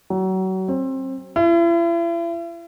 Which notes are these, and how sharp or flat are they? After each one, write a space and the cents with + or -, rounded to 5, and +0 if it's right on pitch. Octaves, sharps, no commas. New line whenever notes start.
F#3 +30
C4 +25
E4 +40